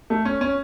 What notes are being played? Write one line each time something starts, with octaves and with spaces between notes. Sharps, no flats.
A3
C#4
C#4